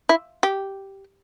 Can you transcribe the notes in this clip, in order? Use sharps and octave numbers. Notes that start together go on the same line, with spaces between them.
E4
G4